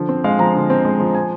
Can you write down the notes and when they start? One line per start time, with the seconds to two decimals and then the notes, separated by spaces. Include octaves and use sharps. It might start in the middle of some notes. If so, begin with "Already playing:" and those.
Already playing: D3 F3
0.09 C4
0.24 G#3 F5
0.39 F3 A#5
0.55 D3
0.70 C4
0.85 G#3
1.00 F3
1.15 G#5